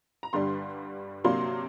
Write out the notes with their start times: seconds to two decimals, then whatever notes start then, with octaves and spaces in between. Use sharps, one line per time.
0.23 A#5
0.33 G2 D3 G3 D4 C6
1.24 C3 F#3 A#3 D4 C6